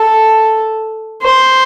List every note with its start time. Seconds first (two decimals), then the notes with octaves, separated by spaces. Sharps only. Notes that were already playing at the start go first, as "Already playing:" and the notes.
Already playing: A4
1.22 C5